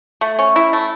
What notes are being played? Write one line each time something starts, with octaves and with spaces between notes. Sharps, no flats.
A3
C#4
E4
A3